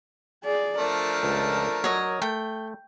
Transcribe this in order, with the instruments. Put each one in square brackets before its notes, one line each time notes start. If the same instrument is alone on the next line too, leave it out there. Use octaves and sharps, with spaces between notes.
[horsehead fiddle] G#4 D5
[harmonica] F3 A3 D4 [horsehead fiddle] A#4
[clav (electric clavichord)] C#2
[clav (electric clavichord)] F#3 [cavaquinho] C#5 D#5
[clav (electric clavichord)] A3 [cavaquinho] G5